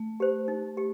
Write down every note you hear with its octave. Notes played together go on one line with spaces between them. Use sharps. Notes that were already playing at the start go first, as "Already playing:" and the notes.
Already playing: A3
G4 C5
D#4
G4